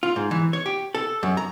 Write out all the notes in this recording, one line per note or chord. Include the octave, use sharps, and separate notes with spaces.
F4
G#2
E3
C#5
G4
A4
F#2
A#5